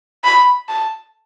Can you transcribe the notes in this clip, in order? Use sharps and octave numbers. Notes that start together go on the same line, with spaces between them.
B5
A5